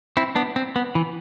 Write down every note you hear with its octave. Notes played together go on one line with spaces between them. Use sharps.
C4 E4
B3 D4
C4
B3
E3